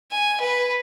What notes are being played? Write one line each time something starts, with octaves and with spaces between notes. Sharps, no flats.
G#5
B4